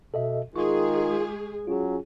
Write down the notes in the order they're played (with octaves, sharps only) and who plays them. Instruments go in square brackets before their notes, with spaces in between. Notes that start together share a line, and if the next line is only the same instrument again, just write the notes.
[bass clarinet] B2 [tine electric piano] A4 D#5 E5
[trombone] D#3 [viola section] G#3 G#4 [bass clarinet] F4 [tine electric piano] C#6
[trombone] F#3 [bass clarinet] C#4 [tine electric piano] F4 G#4